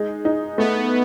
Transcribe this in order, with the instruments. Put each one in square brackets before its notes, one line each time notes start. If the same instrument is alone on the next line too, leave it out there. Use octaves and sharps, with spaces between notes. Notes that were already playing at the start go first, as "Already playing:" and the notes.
Already playing: [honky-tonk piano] G#3 D#4
D#4
[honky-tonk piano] A3 [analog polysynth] B3